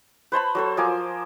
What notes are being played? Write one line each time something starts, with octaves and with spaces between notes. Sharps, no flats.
B4 C5 A5 B5
F#3 A4 C5
F3 A#4 G#5 D6